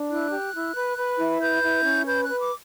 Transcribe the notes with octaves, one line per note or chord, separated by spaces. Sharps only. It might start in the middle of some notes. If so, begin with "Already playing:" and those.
Already playing: D4
E4 F#6
G4
E4
B4
B4
E4
B4 G6
E4
C#4
B4 G6
F#6
B4
D6